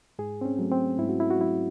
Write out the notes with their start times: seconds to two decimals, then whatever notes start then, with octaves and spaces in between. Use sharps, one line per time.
0.19 G#2 G#4
0.41 C4
0.45 C#4
0.59 F#3 A3
0.72 C4
0.99 G#2 E4
1.09 F#4
1.20 E4
1.31 F#4
1.39 F#3 E4